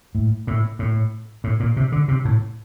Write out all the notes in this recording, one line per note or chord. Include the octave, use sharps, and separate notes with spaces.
A2
A2
A2
A2
A#2
C3
D3
C3
A2